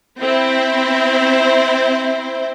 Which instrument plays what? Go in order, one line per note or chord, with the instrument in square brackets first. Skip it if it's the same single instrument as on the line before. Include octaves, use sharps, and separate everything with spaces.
[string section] C4 E4 C5